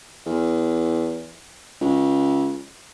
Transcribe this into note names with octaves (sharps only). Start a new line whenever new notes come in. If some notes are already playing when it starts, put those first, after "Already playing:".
E2
C#2